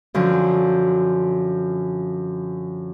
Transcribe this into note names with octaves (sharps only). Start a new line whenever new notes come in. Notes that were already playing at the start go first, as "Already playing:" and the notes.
F#2 D3 F3